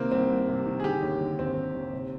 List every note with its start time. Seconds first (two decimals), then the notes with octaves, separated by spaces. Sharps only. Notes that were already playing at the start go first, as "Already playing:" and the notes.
Already playing: C3 D#3 A#3 C4
0.12 C2 C4
0.30 C2
0.49 C3
0.66 D#3
0.80 G#4
0.84 D3 G4
1.02 D#2
1.21 D3
1.39 D#2 C4
1.57 D3
1.75 D#2
1.93 C3